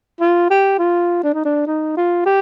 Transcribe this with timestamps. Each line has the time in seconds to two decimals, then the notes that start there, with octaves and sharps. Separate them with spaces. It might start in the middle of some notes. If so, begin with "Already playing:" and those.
0.21 F4
0.50 G4
0.79 F4
1.23 D4
1.34 D#4
1.45 D4
1.67 D#4
1.97 F4
2.26 G4